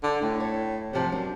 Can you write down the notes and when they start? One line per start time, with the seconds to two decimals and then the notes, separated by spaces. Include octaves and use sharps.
0.03 D3
0.22 A2 D4
0.40 C#5
0.93 C3 F3 F#3
1.12 F#2 D4 F4